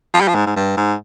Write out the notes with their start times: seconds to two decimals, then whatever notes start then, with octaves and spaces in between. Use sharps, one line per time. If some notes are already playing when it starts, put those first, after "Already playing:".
0.14 F3
0.21 G3
0.28 F3
0.35 G#2
0.46 G#2
0.56 G2
0.77 G#2